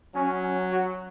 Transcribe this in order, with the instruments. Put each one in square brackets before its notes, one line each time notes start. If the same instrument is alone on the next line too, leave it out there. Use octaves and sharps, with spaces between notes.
[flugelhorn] F#3 [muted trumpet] C#4
[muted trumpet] C#4
F#4